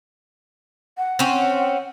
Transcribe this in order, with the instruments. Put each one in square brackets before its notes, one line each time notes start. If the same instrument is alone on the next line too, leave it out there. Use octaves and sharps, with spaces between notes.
[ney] F#5
[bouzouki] C4 C#4